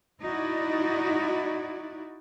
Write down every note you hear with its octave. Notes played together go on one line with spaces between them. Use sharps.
D#4 E4 F#4 D5